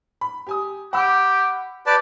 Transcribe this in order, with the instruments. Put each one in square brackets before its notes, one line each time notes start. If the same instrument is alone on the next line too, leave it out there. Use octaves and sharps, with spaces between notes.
[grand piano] B5
G4 G#5 D#6
[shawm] G4 [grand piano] F#5 B5 E6
[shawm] G4 [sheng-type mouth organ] B4 D5 A5